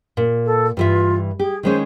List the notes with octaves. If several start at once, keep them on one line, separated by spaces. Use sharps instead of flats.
A#2
A4
G2 E3 F4 E5
G4 G#4
D#3 G#3 C#4 C5